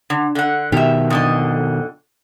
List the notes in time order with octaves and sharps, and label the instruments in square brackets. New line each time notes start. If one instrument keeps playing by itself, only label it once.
[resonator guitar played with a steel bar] D3
D3 F#5
[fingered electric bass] B2 D#3 [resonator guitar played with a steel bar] G4 E5
[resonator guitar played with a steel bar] F2 D3 D#5